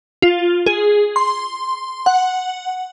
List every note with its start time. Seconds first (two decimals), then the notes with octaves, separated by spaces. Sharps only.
0.22 F4
0.66 G#4
1.16 C6
2.06 F#5